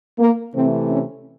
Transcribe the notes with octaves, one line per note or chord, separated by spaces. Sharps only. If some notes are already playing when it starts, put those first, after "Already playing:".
A#3
C3 E3 A3 C4
C#4